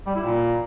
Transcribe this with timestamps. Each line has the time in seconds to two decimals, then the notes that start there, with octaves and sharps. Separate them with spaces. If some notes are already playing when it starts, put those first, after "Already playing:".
0.06 G3
0.15 E4
0.23 A#2